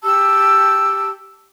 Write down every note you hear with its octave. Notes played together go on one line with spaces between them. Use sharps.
G4 A5 E6